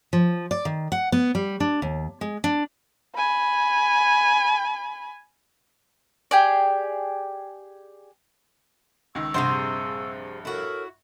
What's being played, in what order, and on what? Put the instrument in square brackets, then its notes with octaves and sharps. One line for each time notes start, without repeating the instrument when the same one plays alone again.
[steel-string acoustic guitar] F3
D5
D#3
F#5
B3
G3
D4
D#2
G#3
D4
[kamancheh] G#5 B5
[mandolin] G4 G#4 D5
[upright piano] C#2 D#3 [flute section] C#6 E6
[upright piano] A#1 G2 F#5 [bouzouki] C3 G#4 C5
[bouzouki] E4 F#4 [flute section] A4 A#4 C#5